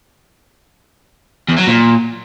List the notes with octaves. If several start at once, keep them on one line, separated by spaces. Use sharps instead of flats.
E2
F#3
A#2